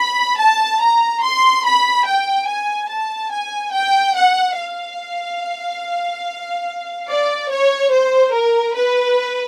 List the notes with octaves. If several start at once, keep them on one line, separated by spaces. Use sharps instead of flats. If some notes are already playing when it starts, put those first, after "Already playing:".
Already playing: B5
A5
A#5
C6
B5
G5
G#5
A5
G#5
G5
F#5
F5
D5
C#5
C5
A#4
B4